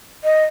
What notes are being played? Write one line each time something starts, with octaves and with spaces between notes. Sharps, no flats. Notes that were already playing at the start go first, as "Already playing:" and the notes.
D#5